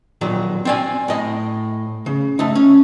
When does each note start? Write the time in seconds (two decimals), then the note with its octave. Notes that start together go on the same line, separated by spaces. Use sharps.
0.21 A#2 D#3 F#3
0.65 C4 D5 G#5
1.08 A2 D#5
2.06 C#3
2.39 A3 D#4
2.55 C#4